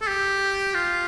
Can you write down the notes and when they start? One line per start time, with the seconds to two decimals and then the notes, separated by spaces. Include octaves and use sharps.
0.01 A4
0.07 G4
0.75 F4